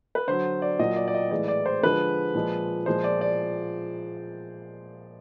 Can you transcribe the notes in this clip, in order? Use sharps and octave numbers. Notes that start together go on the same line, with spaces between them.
B4
D3 F#3 C5
D5
A#2 F#3 D#5
D5
D5
D#5
A2 E3 G#3 D5
D5
C5
D3 F3 G#3 B4
A#2 F3 G#3
A#2 F3 G#3 C5
D5
D5